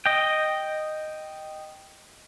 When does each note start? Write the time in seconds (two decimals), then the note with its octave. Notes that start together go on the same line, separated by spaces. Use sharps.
0.06 D#5 G5